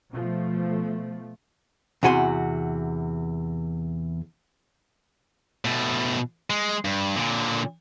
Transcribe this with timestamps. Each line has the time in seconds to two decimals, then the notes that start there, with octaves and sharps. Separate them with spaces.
0.12 B2 F3 A3
2.03 E2 C3 F#4 G#5 C6
5.65 B2 A3
6.50 G#3
6.85 G2
7.16 A#2 D3